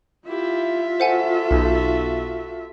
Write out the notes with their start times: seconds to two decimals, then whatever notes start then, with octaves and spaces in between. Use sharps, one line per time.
0.28 E4 F4 G4 E5
1.00 F#4 A4 C5 F#5 G#5
1.51 B1